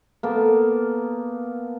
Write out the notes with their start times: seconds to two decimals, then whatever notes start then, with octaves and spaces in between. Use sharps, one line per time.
0.23 A#3 B3 A4